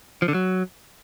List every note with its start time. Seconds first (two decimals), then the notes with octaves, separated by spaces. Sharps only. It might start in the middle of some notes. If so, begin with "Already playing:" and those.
0.22 F3
0.28 D3
0.34 F#3